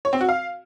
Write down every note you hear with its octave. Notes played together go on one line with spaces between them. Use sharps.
C#5
C4
F#4
F5